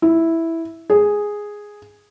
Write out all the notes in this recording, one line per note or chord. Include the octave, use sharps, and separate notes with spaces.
E4
G#4